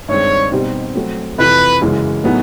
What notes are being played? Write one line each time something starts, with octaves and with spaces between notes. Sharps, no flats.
G2 D#3 G#3 C4 C#5
B2 G3 C4 D#4 G4
F#3 A3 C4
F2 C3 E3 B4
F#2 C#3 E3 G#3
A2 F#3 B3 D#4 G#4